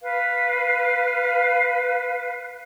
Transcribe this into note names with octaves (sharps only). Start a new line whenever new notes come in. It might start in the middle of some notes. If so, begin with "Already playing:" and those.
B4 F5